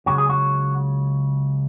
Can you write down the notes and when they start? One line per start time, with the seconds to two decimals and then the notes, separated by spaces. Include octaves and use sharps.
0.06 C#2 C#3 F#3 F#4
0.18 G#4
0.29 F#4